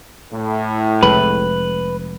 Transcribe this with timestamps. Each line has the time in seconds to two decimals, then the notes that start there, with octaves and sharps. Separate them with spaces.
0.33 A2
1.03 F1 G#3 B4